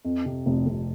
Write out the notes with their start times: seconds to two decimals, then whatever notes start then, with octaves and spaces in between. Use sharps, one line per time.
0.05 F2
0.26 C3
0.46 F1
0.67 F1